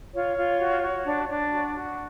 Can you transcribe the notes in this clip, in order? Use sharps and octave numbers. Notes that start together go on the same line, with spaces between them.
F4 C#5
F4
F#4
F#4
D4
D4
F#4
F#4